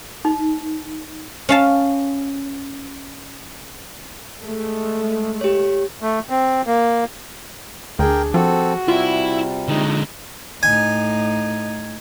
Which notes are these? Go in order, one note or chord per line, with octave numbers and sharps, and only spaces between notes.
D#4
C#4 F5 A5
G#3 A3
G4 C#5
A3
C4
A#3
D2 D4 G#4 A#4 G5
F3 C4 F#4 A4
C3 G3 E4 F4
D3 G#3 D#4
A2 D#4 G#5